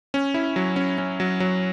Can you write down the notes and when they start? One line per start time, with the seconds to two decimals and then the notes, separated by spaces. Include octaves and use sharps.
0.14 C#4
0.34 E4
0.56 F#3
0.76 C#4
0.98 C#4
1.20 F#3
1.40 F#3